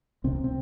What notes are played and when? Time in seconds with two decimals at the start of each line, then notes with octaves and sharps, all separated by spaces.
0.24 C2 C3 C4
0.44 C4